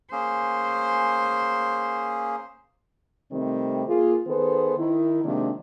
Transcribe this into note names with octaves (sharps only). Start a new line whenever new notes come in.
A#3 C#4 G#4 C5
C3 D#3 G3 A3 C4
A#3 F4 G#4
D#3 B3 G#4 A4 B4 C5
D#3 E4
C3 D#3 F3 G#3 A#3 D4